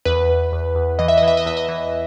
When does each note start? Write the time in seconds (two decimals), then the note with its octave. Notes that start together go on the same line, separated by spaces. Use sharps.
0.05 E2 B4
0.29 E2
0.52 E2
0.75 E2
0.99 E3 D#5
1.08 E5
1.18 D#5
1.22 E3
1.28 E5
1.37 D#5
1.46 E2 E5
1.57 D#5
1.69 E3